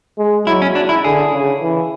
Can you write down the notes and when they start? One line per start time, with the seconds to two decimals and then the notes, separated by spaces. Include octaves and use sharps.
0.19 G#3
0.47 F#3 E4
0.62 C#4
0.75 D4
0.89 E4
1.04 D3 G#4
1.33 C#3
1.61 E3